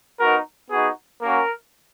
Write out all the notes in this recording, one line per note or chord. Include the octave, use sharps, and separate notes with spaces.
B3 D#4 F#4 A#4
B3 D#4 F#4 G#4
A#3 C#4 F#4 A#4